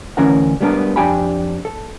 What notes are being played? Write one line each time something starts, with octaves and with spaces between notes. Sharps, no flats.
D2 E3 C#4 A#4 F#5
G3 G#3 B3 D4 G#4 A#4
F2 D4 G4 G5 G#5 B5
A4